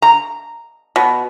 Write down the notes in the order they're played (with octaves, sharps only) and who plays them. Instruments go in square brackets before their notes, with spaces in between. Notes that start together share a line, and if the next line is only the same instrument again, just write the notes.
[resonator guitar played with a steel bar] A#5
[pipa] B2